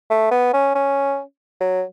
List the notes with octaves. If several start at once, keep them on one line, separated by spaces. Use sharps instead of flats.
A3
B3
C#4
C#4
F#3